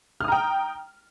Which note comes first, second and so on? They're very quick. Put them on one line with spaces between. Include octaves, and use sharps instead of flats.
F6 D#6 A#5 G5